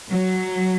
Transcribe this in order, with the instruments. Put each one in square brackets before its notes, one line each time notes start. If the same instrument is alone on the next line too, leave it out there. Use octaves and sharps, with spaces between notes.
[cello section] F#3